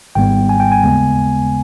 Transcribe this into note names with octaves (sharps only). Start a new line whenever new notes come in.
G#1 G#2 G3 B3 G5
G#5
G5
G#5
D#2 C#3 G#3 B3